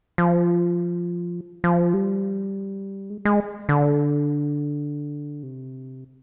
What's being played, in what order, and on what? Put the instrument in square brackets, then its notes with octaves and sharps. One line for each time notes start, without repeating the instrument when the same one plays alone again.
[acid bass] F3
F3
G3
G#3
G#3
D3
C3